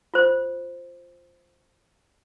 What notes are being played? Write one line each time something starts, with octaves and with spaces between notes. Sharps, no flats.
F4 C5